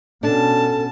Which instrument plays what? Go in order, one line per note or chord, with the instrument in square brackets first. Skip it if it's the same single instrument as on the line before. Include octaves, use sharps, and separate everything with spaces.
[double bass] B2 C#4 [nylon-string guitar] D4 [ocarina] A4 [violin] A5